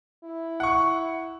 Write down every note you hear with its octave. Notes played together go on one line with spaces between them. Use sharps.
E4
F#5 C#6